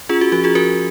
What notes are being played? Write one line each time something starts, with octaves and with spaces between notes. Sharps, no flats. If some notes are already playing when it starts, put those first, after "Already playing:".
C#4 F4 G#4
F#4
F3 F#4
F4 G#4
F3 F#4 A#4